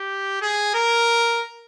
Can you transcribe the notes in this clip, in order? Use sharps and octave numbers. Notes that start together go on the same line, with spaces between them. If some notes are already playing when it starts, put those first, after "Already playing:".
Already playing: G4
G#4
A#4